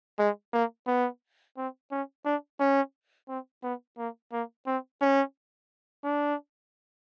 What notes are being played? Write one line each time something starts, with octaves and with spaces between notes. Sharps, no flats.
G#3
A#3
B3
C4
C#4
D4
C#4
C4
B3
A#3
A#3
C4
C#4
D4